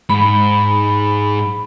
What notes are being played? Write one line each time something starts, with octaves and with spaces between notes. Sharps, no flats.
G#2 B5